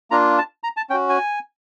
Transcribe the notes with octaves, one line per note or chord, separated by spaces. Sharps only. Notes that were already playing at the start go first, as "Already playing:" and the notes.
A#3 D4 F4 A#5
A5
A#5
A5
C#4 F#4 G5
G#5